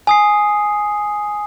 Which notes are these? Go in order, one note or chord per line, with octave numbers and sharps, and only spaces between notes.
G#5 D#6 C7